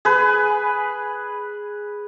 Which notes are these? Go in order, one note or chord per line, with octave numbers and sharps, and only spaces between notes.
G#4 B4